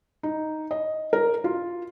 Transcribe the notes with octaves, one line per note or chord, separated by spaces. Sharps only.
D#4
D#5
A#4
F4